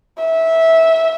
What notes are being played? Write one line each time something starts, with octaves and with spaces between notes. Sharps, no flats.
E5